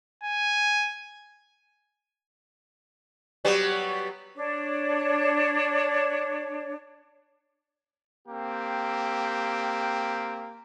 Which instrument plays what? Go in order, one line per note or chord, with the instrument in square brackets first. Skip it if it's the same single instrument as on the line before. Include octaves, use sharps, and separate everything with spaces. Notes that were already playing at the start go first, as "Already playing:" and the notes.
[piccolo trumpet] G#5
[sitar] F#3 G3 B3
[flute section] D4 C#5
[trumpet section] A#3 C4 G4